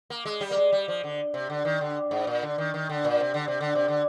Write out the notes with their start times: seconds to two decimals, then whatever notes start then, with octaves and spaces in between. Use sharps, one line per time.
0.10 A#3
0.25 G#3
0.41 G3
0.51 A#3
0.57 G#3
0.72 G3
0.88 F3
1.04 D3
1.34 C3
1.50 D3
1.65 D#3
1.81 D3
2.11 G#2
2.27 A#2
2.42 D3
2.58 D#3
2.74 D#3
2.89 D3
3.04 A#2
3.20 C3
3.34 D3
3.48 C3
3.60 D3
3.75 C3
3.88 D3